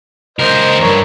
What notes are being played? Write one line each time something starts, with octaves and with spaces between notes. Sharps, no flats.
C#2 A#4 C5 D#5
E2 G2 A#4 C#5